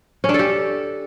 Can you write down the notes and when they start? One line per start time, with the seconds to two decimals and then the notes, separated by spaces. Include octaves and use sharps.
0.24 C#4
0.29 D4
0.34 A4
0.39 G4